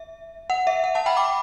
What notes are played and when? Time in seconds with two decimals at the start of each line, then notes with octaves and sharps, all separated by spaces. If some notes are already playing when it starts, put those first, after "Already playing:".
Already playing: E5
0.50 F#5
0.67 E5
0.84 F#5
0.95 F#5 A5
1.06 G5 B5
1.17 B5 D6